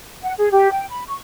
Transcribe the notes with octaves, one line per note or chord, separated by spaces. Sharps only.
F#5
G#4
G4
G5
B5
C#6